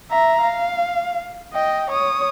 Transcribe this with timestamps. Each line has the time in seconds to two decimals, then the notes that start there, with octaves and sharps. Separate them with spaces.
0.11 E5 A#5
0.42 F5
1.53 D#5 G5
1.90 C#5 D#6